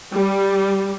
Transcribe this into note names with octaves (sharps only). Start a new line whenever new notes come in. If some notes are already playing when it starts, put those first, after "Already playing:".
G3